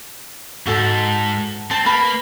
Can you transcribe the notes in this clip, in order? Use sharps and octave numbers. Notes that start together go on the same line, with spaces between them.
G#2 F#4 A4 A5
C4 A5
A#3 B4 B5